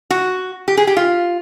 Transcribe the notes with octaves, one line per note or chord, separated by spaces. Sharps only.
F#4
G4
G#4
G4
F4